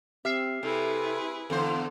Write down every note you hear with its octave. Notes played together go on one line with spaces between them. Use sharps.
C4 G4 E5 F6 C7
C3 E4 G#4 A4 B4
E2 D3 A4 C5 F5